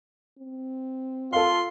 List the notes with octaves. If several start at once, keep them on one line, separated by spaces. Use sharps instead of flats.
C4
F4 A4 F5 C6